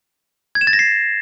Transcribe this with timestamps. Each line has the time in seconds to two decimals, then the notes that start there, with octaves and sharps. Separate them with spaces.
0.55 G#6
0.61 E7
0.67 A6
0.73 A#6
0.79 C7